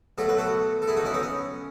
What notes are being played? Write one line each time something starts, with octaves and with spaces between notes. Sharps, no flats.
B2 F#3 A3 A4
B4
F#4 A4
A4
E4 G#4
D#4 F#4
C#4 E4
B3 D#4
C#4